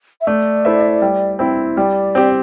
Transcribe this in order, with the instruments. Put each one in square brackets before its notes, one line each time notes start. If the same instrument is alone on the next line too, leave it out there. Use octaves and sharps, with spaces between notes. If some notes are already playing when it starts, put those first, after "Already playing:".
[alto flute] E5
[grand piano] A3 [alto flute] D5
[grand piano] E4 A4 C5 E5
G3
C4 E4
[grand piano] G3 [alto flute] D5
[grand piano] C4 G4